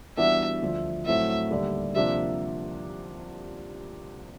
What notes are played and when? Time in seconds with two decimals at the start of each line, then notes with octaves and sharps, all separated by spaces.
0.17 E3 G3 B3 D4 F#4 E5
0.62 D2 D3 F3
1.06 A2 F#3 A3 C4 E4 E5
1.51 D#2 D3 G3
1.95 C3 F3 A#3 D4 E5